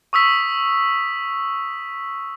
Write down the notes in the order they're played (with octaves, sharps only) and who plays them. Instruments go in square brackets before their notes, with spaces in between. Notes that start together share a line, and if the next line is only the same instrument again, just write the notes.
[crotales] C#6 D#6 E6 B6